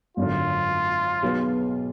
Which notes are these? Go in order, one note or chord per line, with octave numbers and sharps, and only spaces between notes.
G#1 F#2 D3 F4
B1 B2 G#3 B3